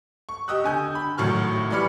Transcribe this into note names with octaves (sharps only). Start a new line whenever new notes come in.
C#6
G4 D#5 D#6 E6 F#6
D3 G#5 G6
B5
G#1 A2 F#3 C#6 F6
E3 G3 D5 B5 F6 C#7